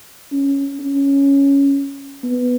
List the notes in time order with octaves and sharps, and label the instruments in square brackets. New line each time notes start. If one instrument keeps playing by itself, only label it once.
[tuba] C#4
C#4
B3